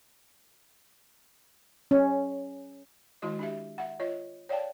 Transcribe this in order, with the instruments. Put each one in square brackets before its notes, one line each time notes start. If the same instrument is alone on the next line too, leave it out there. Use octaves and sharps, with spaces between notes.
[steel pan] C#4
[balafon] D#3 G#3 E4 F#4 D#5
D4 G4 E5
E5 F#5
F4 C#5 D#5
C#5 D5 F5 G5 A5